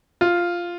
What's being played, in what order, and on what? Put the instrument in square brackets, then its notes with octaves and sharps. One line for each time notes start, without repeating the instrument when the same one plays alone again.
[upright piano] F4